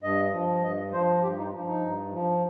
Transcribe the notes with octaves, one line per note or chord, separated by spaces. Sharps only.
G2 D#5
F3
G2 D#5
F3 C5
G2 G4
D#4
F3
D#4
G2
F3